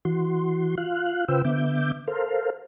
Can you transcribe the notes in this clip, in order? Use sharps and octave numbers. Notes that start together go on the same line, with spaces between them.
E3 F#4 C6
F4 F5 F#6
C#3 F4 B4 C5 G5 E6
D3 B3 E5 D6 G6
A4 A#4 C5 F5